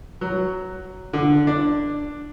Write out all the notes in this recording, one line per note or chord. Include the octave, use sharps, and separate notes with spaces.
F#3
D3
D4